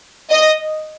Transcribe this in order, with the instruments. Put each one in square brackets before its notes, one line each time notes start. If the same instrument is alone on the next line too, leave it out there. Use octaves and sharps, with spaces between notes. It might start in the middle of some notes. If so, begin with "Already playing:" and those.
[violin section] D#5